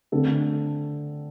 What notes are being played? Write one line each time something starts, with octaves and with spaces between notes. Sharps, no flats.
D3 A3 C4 A4